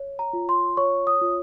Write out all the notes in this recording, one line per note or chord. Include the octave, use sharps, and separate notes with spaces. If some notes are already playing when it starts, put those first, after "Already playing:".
Already playing: C#5
A#5
F4
C6
C#5 C#6
D#6
F4